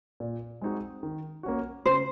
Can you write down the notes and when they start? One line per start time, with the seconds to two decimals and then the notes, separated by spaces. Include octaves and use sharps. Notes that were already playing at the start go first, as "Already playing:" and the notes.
0.20 A#2
0.61 G#3 C4 D#4 F#4
1.03 D#3
1.43 A#3 C#4 F#4
1.85 C#3 C5